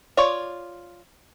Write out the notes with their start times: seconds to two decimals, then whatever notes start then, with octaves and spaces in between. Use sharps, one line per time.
0.17 F4 C#5 D5